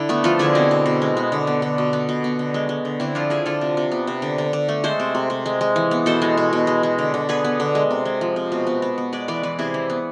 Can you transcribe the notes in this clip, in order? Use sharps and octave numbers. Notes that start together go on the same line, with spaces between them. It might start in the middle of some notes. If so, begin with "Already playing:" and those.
Already playing: D3 D4 E4
A3 B3
F3 F4 A4
D3 E4 G#4
B2 C4
B2
B2
G#3
B3
D3
B3
D3
B2
B3
B2
B3
D3
G#3
G#3
D3
D3 C4 E4
F3 D4 F4
F3 E4 G#4
D3 F4 A4
C3
C3
B3
C3
D3
D3
D3
A3
G#3 A4 C5
C3
C3
C3
G#3
G#3
E3
B3
B2 A4 C5
G#3
B2
B2
G#3
G#3
D3
D3
B3 G#4 B4
B3
D3
G#3
C3
G#3
F3
C3
B2
B3
B3
B3
G#3 B4 D5
E3 B4 D5
E3 B4 D5
C3 E4 G#4
E3
B3